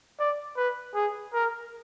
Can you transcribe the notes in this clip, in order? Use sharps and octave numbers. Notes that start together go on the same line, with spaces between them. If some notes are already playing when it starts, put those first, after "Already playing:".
D5
B4
G#4
A#4